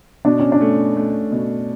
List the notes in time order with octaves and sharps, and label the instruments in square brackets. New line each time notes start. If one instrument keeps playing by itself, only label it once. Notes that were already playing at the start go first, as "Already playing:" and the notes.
[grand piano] B2 [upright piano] D4
[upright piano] C#4
D4
[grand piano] A3
A3
B2